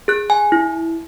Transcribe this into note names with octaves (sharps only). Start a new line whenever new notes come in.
G#4 F#6
G#5
E4